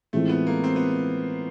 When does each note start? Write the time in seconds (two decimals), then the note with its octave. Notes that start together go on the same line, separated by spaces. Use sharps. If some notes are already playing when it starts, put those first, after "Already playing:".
0.13 A2 E3 G#3 A3 C4 F4
0.29 B3
0.47 A#3
0.64 C4
0.76 B3